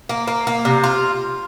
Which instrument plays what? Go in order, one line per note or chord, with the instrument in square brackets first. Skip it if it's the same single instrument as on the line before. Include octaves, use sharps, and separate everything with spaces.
[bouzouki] A#3
A#3
A#3
C3
F4